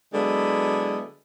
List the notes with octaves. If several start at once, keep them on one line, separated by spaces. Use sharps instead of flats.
D3 F#3 G#3 B3 E4